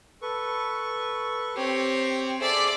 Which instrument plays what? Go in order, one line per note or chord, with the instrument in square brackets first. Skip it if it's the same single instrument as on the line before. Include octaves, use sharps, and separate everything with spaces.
[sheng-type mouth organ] A4 B4 C#6
[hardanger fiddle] C4 C#5 [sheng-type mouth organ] G4
[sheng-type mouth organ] G#4 A4 C6 [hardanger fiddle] D5 E5